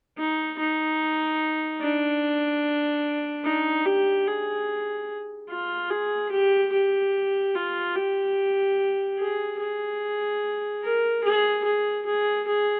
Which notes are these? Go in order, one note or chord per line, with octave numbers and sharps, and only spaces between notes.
D#4
D#4
D4
D#4
G4
G#4
F4
G#4
G4
G4
F4
G4
G#4
G#4
A#4
G#4
G#4
G#4
G#4